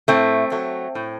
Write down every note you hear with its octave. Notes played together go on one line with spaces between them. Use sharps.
A2 A3 C4
F#3 A3
A2